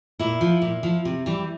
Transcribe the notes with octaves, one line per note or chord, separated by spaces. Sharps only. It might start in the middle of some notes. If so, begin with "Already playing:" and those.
A#2 E4
F3
A#2
F3
C3
E3 G3